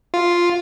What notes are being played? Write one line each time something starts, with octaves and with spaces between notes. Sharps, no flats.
F4